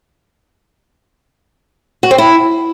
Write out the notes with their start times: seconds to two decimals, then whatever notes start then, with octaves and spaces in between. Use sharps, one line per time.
2.03 F#4
2.11 C4
2.18 E4